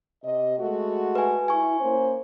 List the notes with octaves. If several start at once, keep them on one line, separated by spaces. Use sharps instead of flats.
C3 D#5
G#3 A3 F#4
B4 G#5
E4 G#5 C#6
A#3 C#4 C5